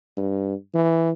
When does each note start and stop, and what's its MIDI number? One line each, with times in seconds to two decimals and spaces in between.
0.17 0.55 43
0.74 1.11 52